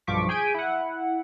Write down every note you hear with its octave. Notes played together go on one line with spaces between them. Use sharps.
B1 G2 F3 C#6 D6 B6
G#4 G#5 G6 B6 D7 D#7
E4 F#5